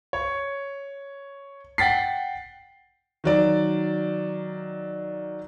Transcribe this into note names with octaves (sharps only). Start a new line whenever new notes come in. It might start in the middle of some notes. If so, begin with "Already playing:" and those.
C#5
F#5 G5 A6 B6 C7
D#3 F#3 D5